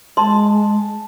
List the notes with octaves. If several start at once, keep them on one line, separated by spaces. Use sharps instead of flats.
G#3 A5 C6